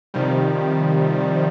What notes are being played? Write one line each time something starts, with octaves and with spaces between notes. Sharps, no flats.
C3 D#3 F3 G3